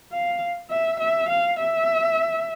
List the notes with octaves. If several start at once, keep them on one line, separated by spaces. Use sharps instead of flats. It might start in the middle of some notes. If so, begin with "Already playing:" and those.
F5
E5
E5
F5
E5